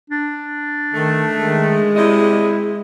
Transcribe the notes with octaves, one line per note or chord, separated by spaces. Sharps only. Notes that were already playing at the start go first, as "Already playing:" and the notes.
D4
D#3 A3
D#3 G#3
C3 G3 E4 D#5